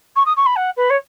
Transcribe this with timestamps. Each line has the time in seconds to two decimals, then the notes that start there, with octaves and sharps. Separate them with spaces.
0.16 C#6
0.26 D#6
0.37 C#6
0.46 B5
0.56 F#5
0.77 B4
0.90 C#5